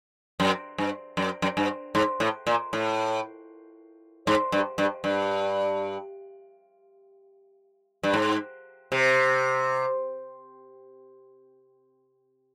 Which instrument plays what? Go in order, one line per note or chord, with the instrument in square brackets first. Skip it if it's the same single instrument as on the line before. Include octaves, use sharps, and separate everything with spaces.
[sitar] F#2
G2
F#2
F#2
G2
G#2
A2
A#2
A2
G#2
G2
G2
G2
G2
G#2
C3